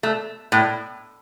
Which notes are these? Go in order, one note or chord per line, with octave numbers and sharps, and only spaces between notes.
A3
A2